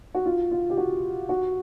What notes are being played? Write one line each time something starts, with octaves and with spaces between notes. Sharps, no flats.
F#4
F4
F4
G4
F#4
F#4